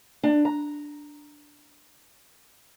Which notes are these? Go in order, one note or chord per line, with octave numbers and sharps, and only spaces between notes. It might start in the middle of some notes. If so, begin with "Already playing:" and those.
D4
A#5